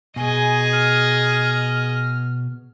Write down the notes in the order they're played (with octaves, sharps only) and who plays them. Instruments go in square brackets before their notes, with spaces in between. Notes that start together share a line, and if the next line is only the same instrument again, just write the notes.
[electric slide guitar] B2 [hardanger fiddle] G#4 D#5 [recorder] G#5
[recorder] F6